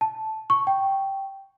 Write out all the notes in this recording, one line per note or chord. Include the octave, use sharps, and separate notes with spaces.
A5
C#6
G5